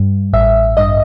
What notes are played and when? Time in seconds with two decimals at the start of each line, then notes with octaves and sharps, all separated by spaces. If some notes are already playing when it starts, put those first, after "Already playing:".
Already playing: G2
0.33 A1 E5
0.77 G2 D#5